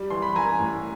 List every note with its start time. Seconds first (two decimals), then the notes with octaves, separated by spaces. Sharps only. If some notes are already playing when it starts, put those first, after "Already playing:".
Already playing: G3
0.10 E3 C6
0.22 B5
0.35 E3 G#5 A#5
0.59 A2